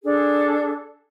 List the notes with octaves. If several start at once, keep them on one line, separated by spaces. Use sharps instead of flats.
D4 G#4 A4